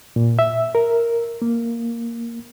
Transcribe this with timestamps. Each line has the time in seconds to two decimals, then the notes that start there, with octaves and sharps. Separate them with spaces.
0.16 A#2
0.39 E5
0.75 A#4
1.42 A#3